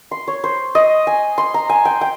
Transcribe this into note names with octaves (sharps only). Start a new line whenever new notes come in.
C6
C#5
C5
D#5
G#5
C6
A#5
G#5
G5
G5